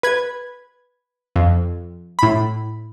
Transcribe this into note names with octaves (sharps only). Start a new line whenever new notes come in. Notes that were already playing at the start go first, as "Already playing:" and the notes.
B4 G#6
F2
A2 B5